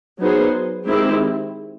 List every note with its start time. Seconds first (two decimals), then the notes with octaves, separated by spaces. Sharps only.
0.19 F#3 B3 D#4 G#4 C5
0.87 D#3 G#3 C4 E4 G4